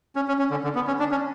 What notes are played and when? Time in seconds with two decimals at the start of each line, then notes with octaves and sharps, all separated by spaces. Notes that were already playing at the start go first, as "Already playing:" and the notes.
0.16 C#4
0.28 C#4
0.39 C#4
0.51 D3
0.64 D3
0.75 B3
0.87 C#4
1.00 D4
1.11 C#4